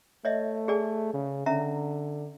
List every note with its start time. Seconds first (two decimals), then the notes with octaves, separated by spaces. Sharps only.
0.25 A3 C#5 D#5 E5
0.68 G#4 D5 G#5
1.14 C#3
1.46 D3 C#4 E5 A#5